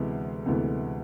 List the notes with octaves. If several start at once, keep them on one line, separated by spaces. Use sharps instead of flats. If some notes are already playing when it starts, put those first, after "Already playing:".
Already playing: D2 C3 E3 G#3 B3
D2 C3 E3 G#3 B3